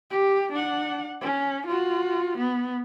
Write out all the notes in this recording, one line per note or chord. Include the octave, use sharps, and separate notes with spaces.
G4
D4 F#5
C#4
F4 F#4
B3